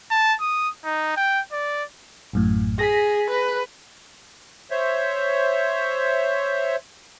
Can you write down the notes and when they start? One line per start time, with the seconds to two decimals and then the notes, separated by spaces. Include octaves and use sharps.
0.11 A5
0.41 D#6
0.85 D#4
1.17 G5
1.52 D5
2.33 A1 F#2 A2
2.79 G#4 A#6 B6
3.30 B4
4.71 C5 C#5 E5